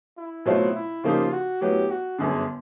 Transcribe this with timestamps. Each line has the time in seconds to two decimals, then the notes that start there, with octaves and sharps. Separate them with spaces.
0.17 E4
0.46 B2 F#3 A3 C4 F4
0.75 E4
1.04 C#3 F3 A#3 D#4 F4 G4
1.32 F#4
1.61 A2 F#3 B3 G4
1.90 F#4
2.19 G1 F#2 D3 G#4